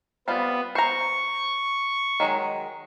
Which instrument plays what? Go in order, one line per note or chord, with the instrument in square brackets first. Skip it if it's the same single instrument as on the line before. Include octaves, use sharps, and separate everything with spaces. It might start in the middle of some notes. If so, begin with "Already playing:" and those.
[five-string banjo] G3 C4 F4 [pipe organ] B3
[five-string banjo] C5 A#5 [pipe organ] C#6
[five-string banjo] D#3 F#3 G#3